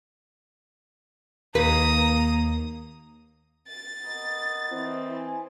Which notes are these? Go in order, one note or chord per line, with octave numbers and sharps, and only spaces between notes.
D#2 A#3 B4 A#5 D#6
A6
B3 A#4 D#5
E3 C4 E4
G#5